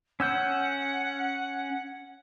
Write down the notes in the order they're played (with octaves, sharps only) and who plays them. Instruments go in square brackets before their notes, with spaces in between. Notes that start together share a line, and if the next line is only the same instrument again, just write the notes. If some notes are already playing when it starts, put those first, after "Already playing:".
[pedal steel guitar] C#4 E6 G6 [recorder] F#5